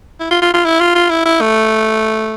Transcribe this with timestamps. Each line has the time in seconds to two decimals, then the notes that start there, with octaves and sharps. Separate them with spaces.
0.20 E4
0.31 F4
0.42 F4
0.54 F4
0.65 E4
0.80 F4
0.95 F4
1.11 E4
1.26 E4
1.41 A3